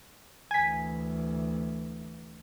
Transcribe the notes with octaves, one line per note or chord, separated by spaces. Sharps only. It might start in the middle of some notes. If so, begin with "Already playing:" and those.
D2 E3 G#5 B6